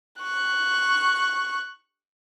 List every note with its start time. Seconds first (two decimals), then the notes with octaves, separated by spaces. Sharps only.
0.22 C#6 F#6